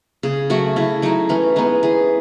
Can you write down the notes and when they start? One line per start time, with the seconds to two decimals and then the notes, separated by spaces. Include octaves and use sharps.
0.23 C#3 G#4
0.50 F#3 A3 F#4
0.76 C#3 E4
1.02 F#3 A3 D#4
1.29 E3 C#4
1.56 G#3 B3 D#4
1.83 E3 G#4